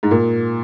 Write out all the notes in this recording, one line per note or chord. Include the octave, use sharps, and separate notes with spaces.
G#2
A#2